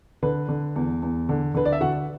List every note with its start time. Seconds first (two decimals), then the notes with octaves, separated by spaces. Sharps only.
0.23 D3 B4
0.49 D3
0.76 E2
1.03 E2
1.29 D3
1.54 D3 B4
1.65 D5
1.72 E5
1.81 D3 F#4 F#5